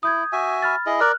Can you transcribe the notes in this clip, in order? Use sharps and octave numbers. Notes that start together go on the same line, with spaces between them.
E4 D#6 G6 G#6
F#4 E5 G#5
B5 F6 A6
E4 G#4 D#5
A#4 D5 F6 F#6